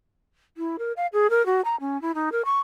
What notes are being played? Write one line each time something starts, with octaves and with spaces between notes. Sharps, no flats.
E4
A#4
F5
G#4
A#4
F#4
A#5
C#4
E4
D#4
A#4
C#6